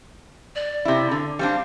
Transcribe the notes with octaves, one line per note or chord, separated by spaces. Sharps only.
D5
C3 E4
D3
G3 C4 D4 F5